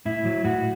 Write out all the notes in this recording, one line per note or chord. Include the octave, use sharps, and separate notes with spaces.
A2 E4
F#3
A2 F#4